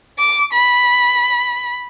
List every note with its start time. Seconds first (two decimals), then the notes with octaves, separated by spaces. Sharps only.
0.19 D6
0.53 B5